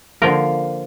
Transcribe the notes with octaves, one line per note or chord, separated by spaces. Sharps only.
D3 F3 A#3 A#4